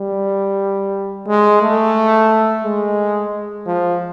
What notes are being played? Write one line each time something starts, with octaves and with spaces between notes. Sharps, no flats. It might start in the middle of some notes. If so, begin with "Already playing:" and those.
Already playing: G3
G#3
A3
G#3
F3